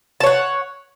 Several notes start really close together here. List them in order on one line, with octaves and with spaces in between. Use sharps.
A5 C#5 F#5